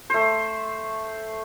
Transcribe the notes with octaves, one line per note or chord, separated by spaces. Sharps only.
A3 C5